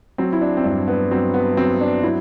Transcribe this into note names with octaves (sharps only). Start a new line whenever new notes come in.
F#3 C4
E4
D4
C4
G2 D4
B3
F#3 C4
B3
F#3 C4
D4
F#3 E4